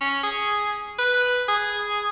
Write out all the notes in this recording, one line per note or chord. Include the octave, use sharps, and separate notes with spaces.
C#4
G#4
B4
G#4